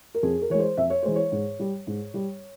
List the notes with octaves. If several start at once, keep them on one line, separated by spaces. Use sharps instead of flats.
A#4
F2 G#4
A#4
E3 G#3 C#5
C5
F2 E5
C#5
E3 G#3 C5
C#5
G#2
G3
G#2
G3